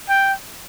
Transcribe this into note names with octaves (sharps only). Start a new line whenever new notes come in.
G5